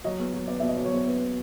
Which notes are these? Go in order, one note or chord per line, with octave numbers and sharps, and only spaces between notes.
F#3 D#5
E2
F#3
B3 D5
B2 E5
D#5
F#3 D5
C#5
E2 C5
B3